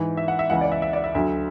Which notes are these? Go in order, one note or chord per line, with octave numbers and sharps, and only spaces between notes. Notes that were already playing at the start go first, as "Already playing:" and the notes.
Already playing: G#2 E3
E5
F#5
E5
C#2 C#3 E3 F#5
D5
E5
E5
D5
E5
D2 D3 F#3 E5